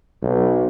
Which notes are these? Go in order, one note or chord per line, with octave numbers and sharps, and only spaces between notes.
B1